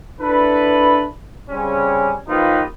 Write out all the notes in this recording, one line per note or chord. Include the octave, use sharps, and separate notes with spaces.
D4 E4 A4 B4
C#3 G3 C4 C#4
F3 A#3 D#4 F4 G4 B4